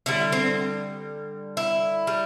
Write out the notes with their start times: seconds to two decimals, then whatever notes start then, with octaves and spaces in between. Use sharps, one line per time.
0.06 D3 G3 E4
0.32 C4
1.57 E4
2.07 G3